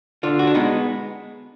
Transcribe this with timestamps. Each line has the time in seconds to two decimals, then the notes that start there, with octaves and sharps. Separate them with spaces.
0.23 D3 F4
0.39 F#4
0.47 D4
0.54 G#3 B3 D#4